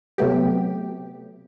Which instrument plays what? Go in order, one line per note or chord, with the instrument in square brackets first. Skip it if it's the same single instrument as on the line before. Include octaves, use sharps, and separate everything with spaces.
[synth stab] C3 F#3 A3 B3 G4